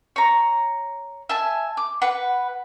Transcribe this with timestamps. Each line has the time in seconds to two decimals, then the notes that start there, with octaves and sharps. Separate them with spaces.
0.16 C#5 A#5
1.29 E5 G#5 A5
1.77 D6
2.02 B4 F#5